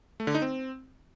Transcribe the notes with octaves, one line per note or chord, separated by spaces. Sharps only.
A3
D3
D#4
C4